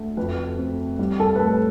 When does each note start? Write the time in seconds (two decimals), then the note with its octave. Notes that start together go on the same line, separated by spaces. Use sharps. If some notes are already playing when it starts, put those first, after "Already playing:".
Already playing: D2 A3
0.17 F2 B4
0.58 C4
0.99 G3
1.20 A4
1.35 B4
1.39 A2 A4